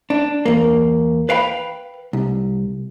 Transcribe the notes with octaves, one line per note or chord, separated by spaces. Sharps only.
D4
E2 A#3
B4 F5 G5 B5
C2